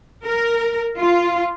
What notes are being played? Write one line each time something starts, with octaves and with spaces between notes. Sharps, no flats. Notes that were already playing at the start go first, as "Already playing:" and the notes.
A#4
F4